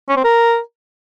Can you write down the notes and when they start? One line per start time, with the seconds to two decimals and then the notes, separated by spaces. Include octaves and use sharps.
0.09 C#4
0.17 C4
0.24 A#4